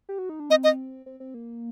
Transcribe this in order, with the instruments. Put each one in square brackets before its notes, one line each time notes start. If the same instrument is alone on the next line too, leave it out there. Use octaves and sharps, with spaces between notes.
[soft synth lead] G4
F#4
D#4
D4
[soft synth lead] C4 [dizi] D#5
[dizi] D#5
[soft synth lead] C4
C4
A#3